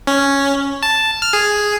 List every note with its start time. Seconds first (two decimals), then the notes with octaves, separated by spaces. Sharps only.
0.07 C#4
0.83 A5
1.22 F6
1.33 G#4